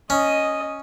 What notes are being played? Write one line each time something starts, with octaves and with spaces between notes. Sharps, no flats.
C#4 D#5 D#6